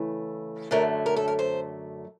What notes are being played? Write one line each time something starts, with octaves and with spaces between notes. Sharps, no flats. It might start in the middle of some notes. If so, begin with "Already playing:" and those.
Already playing: C#3 E3 A3
F#2 D3 F#3 A3 A#4
A#4
A4
A#4
C5